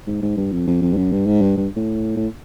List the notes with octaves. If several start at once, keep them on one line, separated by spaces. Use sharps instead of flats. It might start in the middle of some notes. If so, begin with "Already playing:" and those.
G#2
G#2
G2
F2
F2
F2
G2
F#2
G2
G#2
G2
G2
A2
A2